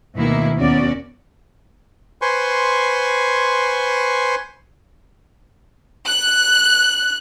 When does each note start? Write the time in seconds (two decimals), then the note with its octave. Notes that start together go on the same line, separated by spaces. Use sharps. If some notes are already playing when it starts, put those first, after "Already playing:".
0.16 D2 B2 D#3 A#3 E4
0.57 D#2 B3 C#4 F#4 D5
2.22 B4 C5 G#5 C6 C#6
6.07 F#6